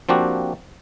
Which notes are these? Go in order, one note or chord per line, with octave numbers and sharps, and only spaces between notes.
F3 A#3 C4 D4 F#4 G4